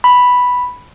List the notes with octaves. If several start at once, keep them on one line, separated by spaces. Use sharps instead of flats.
B5